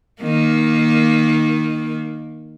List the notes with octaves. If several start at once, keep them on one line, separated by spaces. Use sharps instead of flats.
D#3 A#3